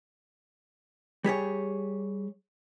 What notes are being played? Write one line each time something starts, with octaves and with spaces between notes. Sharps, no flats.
G3 G4 G#4 C#5